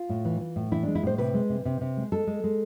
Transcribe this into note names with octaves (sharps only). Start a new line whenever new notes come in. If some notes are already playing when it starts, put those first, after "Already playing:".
Already playing: F4
A2
E3
E3
A2
E3 E4
G#3 D4
E4
A2 C5
C3 B4
G#3
C3
C3
C3
G#3
G#3 A4
G#3
G#3